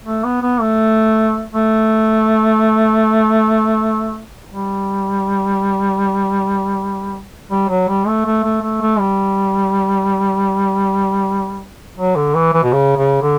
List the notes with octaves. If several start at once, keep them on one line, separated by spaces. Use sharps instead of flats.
A3
B3
B3
A3
A3
G3
G3
F#3
G3
A3
A3
A3
A3
A3
G3
F#3
D3
E3
E3
B2
C#3
C#3
D3